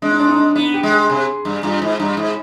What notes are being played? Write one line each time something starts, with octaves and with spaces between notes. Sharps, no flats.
G#3 D4
D#4
D4
D#4
D4
B3 D#4
G4
G#3
G#4
C3 G#4
G2
G2 F4
G#2
G2
G#2